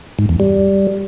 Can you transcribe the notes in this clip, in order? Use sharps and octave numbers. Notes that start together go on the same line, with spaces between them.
G#2
E2
G3